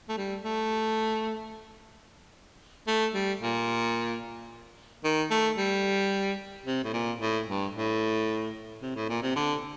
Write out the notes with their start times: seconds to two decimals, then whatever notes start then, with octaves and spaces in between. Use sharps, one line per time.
0.09 A3
0.17 G3
0.44 A3
2.87 A3
3.14 G3
3.42 A#2
5.04 D#3
5.30 A3
5.57 G3
6.66 C3
6.84 A2
6.93 A#2
7.20 A2
7.47 G2
7.74 A2
8.82 C3
8.96 A2
9.09 A#2
9.23 C3
9.36 D3